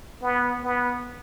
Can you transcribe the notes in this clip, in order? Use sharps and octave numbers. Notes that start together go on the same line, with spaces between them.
B3
B3